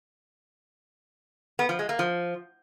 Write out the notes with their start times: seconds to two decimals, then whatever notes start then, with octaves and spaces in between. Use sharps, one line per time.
1.59 B3
1.69 F3
1.79 G#3
1.89 A#3
1.99 F3